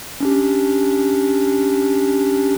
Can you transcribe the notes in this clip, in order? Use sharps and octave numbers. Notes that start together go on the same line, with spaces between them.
C#4 D4 G4